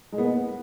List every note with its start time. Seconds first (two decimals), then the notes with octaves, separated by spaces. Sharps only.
0.12 G#3
0.18 B3